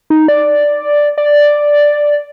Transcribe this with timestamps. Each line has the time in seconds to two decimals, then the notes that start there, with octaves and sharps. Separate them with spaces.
0.10 D#4
0.28 D5
1.18 D5